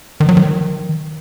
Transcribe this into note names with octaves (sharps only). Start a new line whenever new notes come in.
D#3
F#3
D#3